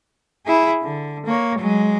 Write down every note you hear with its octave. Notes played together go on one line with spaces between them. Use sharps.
E4 G#4
D3
A#3 C#5
F#3 G#3